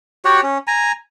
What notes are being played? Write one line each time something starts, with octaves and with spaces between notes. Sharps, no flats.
F#4 G4 C#5 F#5
C#4
G#5 A#5